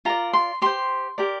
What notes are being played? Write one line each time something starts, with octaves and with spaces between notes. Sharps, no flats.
F4 A#4 D5 A#5
C6
G4 C5 C6
G4 A#4 D5